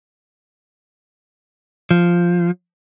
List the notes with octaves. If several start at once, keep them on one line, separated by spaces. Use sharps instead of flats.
F3